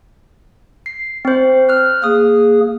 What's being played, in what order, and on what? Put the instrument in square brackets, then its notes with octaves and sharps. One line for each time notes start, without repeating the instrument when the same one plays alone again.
[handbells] C7
C4 C5
F6 F#6
[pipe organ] A#3 G#4 [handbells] D#6